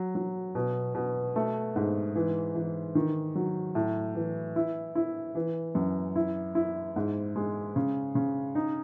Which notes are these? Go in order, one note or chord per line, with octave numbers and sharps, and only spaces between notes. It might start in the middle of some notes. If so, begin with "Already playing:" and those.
Already playing: F#3
F#3
B2
B2
A3
G#2
E3
E3
D#3
F#3
A2
E3
E4
E4
E3
F#2
E4
E4
G#2
G#3
C#3
C#3
D#4